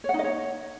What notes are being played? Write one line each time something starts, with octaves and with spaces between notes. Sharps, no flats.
C#5
F#5
D#4
D#5
C#5